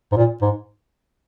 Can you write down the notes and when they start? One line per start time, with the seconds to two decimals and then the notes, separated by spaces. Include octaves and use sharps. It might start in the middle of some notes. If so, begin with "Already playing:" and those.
0.12 G#2
0.17 A#2
0.42 G#2